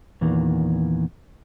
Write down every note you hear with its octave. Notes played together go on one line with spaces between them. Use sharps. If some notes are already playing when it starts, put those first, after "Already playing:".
E2 A#2 D#3 E3